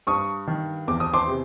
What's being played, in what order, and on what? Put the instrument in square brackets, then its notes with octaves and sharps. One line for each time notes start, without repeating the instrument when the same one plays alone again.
[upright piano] G2 C#6 D#6
D#3
E2 D6
D#6
C6 D6
C3